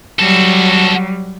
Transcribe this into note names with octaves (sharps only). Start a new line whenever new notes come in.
F#3 G3 F#4 A4